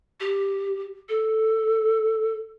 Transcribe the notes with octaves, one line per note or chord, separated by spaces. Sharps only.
G4
A4